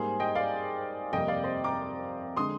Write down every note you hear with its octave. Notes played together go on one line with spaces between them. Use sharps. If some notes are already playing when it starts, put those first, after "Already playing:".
Already playing: G#2 G3 A#3 G#4 C5
D#5 G5
D5 F5
F2 C3 G3 A#3 D#5 G5
D5 F5
C5 D#5
A#5 D6
D3 G#3 C6 D#6